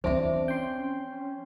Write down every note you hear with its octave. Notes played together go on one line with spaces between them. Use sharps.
E2 F3 C4 D4 C5 E5 D6
C#4 G5 C6